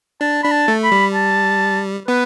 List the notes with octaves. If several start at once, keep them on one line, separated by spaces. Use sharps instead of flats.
D4 A5
D4 B5
A5
A3
B5
G3
A5
B3 B4